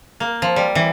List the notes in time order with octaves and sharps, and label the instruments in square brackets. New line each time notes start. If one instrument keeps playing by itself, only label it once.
[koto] A#3
F3
G3
E3